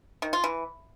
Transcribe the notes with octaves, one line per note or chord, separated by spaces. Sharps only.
D#3
F4
E3